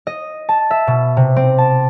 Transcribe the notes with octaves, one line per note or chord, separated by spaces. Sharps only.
D#5
A5
E5
B2
C3
C4
A5